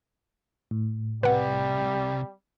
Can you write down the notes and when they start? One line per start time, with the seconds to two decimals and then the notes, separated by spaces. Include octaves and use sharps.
0.71 A2
1.23 C2 C3 G3 B4 F#5